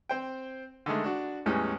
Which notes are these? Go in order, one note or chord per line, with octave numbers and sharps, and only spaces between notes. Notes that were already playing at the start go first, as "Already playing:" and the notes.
C4 C5 G5
D3 D#3 G#3 A3
D4 F#4
E2 A2 G3 G#3 C#4